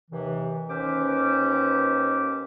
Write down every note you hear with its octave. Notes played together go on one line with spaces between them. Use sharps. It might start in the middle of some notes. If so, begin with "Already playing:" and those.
D#2 C3 E3
D#2 C#4 B4 C5 D6